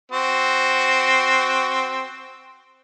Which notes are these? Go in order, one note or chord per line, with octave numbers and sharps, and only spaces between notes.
C4 F#4